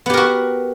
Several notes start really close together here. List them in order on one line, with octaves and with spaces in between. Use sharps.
B3 G4 A#4 F#4